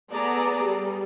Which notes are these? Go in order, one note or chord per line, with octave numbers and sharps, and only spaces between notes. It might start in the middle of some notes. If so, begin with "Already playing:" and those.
B3 G#4 A4 D5 A#5
G3